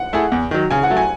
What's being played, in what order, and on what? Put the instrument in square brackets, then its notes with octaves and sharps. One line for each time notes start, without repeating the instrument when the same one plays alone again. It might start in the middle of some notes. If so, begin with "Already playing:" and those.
Already playing: [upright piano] F#5
[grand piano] A3 E4 G#4
E2
D#3 F#3
[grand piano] C#3 [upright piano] G#5
[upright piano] F#5
[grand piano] F#3 A3
[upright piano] G#5